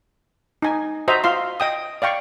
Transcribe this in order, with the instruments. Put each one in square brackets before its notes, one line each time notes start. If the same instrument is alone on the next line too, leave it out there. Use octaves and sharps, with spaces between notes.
[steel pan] D#4 G#5
F#4 C5 D#5 E5 A#5
F4 F5 C6
D#5 G5 D#6
D5 F5 G5 C#6